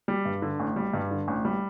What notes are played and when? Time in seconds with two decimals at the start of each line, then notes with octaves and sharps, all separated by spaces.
0.08 G3
0.25 G2
0.42 D3
0.60 A1
0.76 G3
0.94 G2
1.11 D3
1.28 A1
1.45 G3